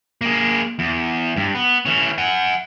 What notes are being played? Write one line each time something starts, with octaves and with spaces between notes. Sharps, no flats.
A#3 G#4
E2
G2
B3
E3 C#4
F#5 G#5